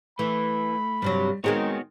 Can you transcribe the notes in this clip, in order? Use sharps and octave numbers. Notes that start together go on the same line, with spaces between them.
E3 A3 B5
G2 C3 F#3 G3
D#3 G#3 B3 C4 D#4 F#4 C#5